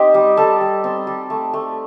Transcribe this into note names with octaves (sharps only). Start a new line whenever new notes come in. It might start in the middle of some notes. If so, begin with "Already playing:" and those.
Already playing: C4 D#4 G4
G3
G3 A4
G3
C4
G3
A3
A3